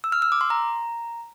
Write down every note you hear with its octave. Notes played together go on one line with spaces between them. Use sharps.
E6
F6
E6
D6
C6
A#5